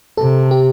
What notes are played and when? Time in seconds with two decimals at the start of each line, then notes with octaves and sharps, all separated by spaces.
0.17 C3 A4
0.51 G4